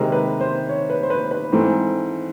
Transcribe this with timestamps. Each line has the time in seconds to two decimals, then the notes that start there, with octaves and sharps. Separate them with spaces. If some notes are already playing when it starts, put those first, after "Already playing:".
Already playing: C3 D#3 G#3 A#4
0.12 B4
0.41 C5
0.69 C#5
0.90 B4
1.03 C5
1.10 B4
1.31 B4
1.52 G#2 E3 A3 C4